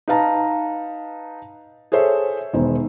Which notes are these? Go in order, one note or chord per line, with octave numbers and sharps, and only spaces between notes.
D#4 B4 F5 A5 A#5
G#4 A4 C5 C#5 E5
E1 D#3 C5